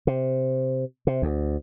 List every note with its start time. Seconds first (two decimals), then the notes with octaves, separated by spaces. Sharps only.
0.07 C3
1.07 C3
1.22 D2